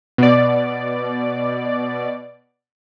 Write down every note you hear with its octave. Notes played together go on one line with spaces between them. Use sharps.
B2 D5